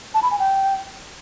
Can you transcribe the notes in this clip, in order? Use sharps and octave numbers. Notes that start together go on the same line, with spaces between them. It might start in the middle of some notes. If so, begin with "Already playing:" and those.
A5
B5
G#5
G5